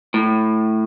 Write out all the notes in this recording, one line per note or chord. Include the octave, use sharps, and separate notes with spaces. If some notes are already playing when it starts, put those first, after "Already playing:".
A2